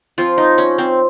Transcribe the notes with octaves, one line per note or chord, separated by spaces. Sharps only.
F3 C4 F4
D#4
C#4
C4